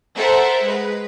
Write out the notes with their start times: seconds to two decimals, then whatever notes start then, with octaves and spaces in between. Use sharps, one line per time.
0.15 A4 A#4 C5 E5 F#5
0.62 G#3 B4